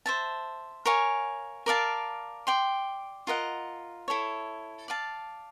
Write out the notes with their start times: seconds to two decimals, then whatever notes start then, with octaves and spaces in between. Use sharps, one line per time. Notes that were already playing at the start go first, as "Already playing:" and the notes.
0.06 C5 E5 A5
0.86 A#4 C#5 F5 G#5
1.66 A#4 D5 F5 A5
2.47 D5 G5 C6
3.27 F4 A#4 D#5 F#5
4.08 E4 A4 C#5
4.88 D5 F5 A5